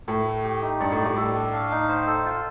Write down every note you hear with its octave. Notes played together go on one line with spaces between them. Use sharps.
A2 A3
A3
G4
D#4
G2 D5
A2
G3
A2
A2 A4
D4
F5
D#4
C5
A4
F4